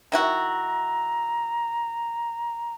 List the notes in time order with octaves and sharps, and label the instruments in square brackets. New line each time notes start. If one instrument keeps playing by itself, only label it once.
[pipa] D#3 E4 F#4 [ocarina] A#5